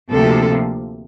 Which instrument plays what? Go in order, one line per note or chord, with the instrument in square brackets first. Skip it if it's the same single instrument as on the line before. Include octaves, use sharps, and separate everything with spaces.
[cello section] D2 C3 F3 A#3 A4